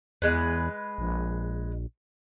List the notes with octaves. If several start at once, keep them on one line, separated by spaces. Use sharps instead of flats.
E2 G#3 B4
A#1